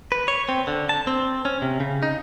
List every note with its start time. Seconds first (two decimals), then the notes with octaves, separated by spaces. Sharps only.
0.12 B4
0.28 C#5
0.49 C4
0.67 D3
0.89 A5
1.07 C4
1.45 C#4
1.62 C3
1.80 C#3
2.03 D#4